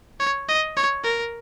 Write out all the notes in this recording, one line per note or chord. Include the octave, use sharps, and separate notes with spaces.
C#5
D#5
C#5
A#4